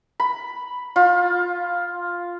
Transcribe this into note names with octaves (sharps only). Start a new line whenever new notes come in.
B5
F4